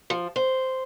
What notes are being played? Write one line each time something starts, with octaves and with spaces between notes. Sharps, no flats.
F3
C5